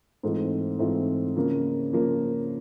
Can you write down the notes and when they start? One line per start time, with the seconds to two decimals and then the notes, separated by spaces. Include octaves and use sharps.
0.23 G#2 E3 A3 C4 F4
0.79 G#2 E3 A3 C4 F4
1.36 C#3 F3 A#3
1.93 C#3 F3 A#3